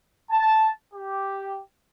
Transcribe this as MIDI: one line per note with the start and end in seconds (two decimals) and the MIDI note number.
0.31 0.70 81
0.94 1.59 67